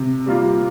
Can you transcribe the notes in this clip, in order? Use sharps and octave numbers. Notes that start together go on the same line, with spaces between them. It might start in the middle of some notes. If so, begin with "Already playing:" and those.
Already playing: C3
G3 A#3 F4